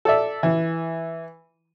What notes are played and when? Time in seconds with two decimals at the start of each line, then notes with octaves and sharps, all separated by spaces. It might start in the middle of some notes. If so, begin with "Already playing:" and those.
0.05 A4 D5 E5
0.43 E3